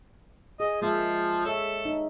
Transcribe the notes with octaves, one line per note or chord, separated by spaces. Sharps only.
G#4 D#5
F3 G#3 A#3 E5
A4 C#5 E5
D#4